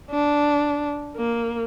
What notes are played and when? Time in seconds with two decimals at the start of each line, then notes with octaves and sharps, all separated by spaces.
0.11 D4
1.16 A#3